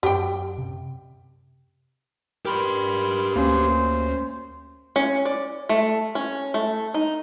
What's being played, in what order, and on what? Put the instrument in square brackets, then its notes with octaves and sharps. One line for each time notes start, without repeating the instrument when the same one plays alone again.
[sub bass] F#2 [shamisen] G4 G5
[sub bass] C3
[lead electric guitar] G4 B4 [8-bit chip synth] A#4 B5 C6
[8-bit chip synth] D2 [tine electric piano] A#3 C#4 [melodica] C5
[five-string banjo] C#4
D5
A3
C#4
A3
D#4